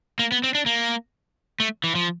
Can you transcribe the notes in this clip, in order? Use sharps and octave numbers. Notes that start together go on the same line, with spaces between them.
A#3
B3
C4
D4
A#3
A3
E3
F3